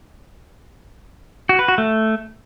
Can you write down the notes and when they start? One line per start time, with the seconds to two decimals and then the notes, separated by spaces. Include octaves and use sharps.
1.49 F#4
1.59 B4
1.68 F#4
1.78 A3